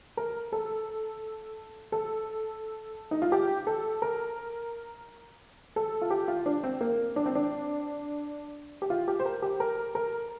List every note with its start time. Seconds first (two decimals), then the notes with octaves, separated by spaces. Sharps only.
0.17 A#4
0.52 A4
1.92 A4
3.11 D#4
3.22 F4
3.32 G4
3.67 A4
4.02 A#4
5.76 A4
6.02 F4
6.10 G4
6.28 F4
6.46 D4
6.64 C4
6.81 A#3
7.16 D4
7.26 C4
7.35 D4
8.82 G4
8.90 F4
9.08 G4
9.20 C5
9.26 A#4
9.42 G4
9.60 A#4
9.95 A#4